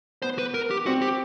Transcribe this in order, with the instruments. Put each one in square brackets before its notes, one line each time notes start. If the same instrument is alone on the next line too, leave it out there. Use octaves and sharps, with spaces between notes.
[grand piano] B3 [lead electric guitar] C5
[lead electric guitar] B4
A#4
G4
[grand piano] C4 [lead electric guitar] F#4
[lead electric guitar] G4